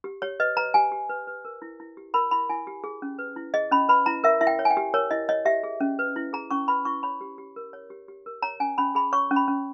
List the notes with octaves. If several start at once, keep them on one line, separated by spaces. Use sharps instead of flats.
G4
G4 C#5
B4 D#5
B4 A#5
G4 G#5
G4
B4
B4
A#4
E4
E4
G4
A#4 B5
E4 B5
E4 G#5
G4
G#4
C#4
B4
E4
G#4 D#5
C#4 B5
B4 B5
E4 A#5
A#4 E5
E4 E5
G5
C#5
G#5
G5
G4
A#4 C#5
E4 D#5
C#5 D#5
G4 E5
G#4
C#4
B4
E4
G#4 A#5
C#4 C#6
B4 B5
E4 C#6
C#5 B5
G4
G4
A#4
C#5
G4
G4
A#4
C#5 A#5
C#4 G#5
C#4 B5
G#4 B5
C#5 C#6
C#4
B5
C#4